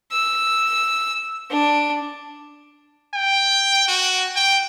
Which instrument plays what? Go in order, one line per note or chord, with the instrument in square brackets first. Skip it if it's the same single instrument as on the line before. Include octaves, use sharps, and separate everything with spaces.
[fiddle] E6
D4
[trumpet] G5
F#4
G5